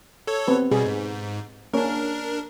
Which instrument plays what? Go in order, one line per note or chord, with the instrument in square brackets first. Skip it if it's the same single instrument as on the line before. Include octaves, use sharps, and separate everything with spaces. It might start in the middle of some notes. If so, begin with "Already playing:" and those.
[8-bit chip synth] A4 C#5
[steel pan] B3 C4 B4
[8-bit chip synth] B2 G3 [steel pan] G#4
[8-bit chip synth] G#2
[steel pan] A#3 C#4 C#5 [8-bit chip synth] D4 A#4